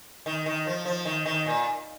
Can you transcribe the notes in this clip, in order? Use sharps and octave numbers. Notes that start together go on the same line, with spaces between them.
D#3
D#3
F3
F3
D#3
D#3
A#2